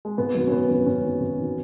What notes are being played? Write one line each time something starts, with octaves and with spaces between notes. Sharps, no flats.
G#3
G#1 B3
F#2 D#3 F#3
C#4
G#1 B3
F#2 D#3 F#3
G#1 C#4
F#2 D#3 F#3
G#1
D#3 F#3